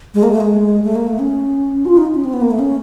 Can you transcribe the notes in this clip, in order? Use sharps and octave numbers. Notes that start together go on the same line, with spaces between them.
G#3
A#3
A3
G#3
A3
A#3
A3
C#4
F#4
F4
D#4
C#4
C4
B3
A#3
A3
C#4